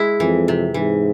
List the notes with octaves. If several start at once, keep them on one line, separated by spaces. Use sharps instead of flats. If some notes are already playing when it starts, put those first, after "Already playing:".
Already playing: G#3 E4 G#4
F2 E3
C3
G#2 E3